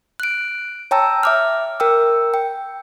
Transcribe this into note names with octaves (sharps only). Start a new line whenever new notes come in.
F#6 D7
C#5 G5 A5 A#5 E6
E5 D6 F6
A#4 G5 E6
G5